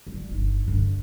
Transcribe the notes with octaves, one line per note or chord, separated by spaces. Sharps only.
G3
G1 D#4
G2 D3